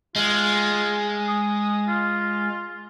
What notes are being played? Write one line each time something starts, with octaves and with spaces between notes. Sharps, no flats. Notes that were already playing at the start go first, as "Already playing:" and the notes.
G#3 F4
D#6
F4